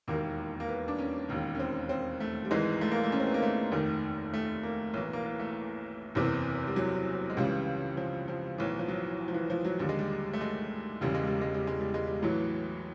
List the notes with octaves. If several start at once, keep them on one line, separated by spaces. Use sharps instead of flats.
E1 D#2 D#3 A#3
A#3
B3
D4
C#4
E1 D#2 D#3
C#4
C4
C4
A3
G3
G#1 G#2 E3 G#3
A3
A#3
A3
C#4
C4
B3
A#3
A3
F1 D#2 D#3
A3
A#3
B1 A2 E3
A#3
B3
A3
F#1 E2 C3 E3
G3
F#3
G#3
C#2 C#3 E3 G3
F3
F3
B1 A2 E3
F3
F#3
F3
E3
F3
F#3
D#2 D3 G3
G#3
G3
A3
G#3
E1 E2 C#3 G3
G#3
G3
G#3
G3
G#3
G3
G#3
G3
A1 A2 E3 F#3